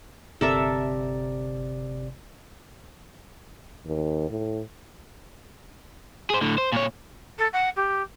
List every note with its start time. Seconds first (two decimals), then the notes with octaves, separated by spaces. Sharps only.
0.41 G1 C3 A4 A#4 D5 E5
3.86 D#2
4.30 A2
6.30 G#4 C5
6.41 A2 D3
6.58 C5
6.72 A#2 C#5
7.39 A4
7.53 F#5
7.76 G4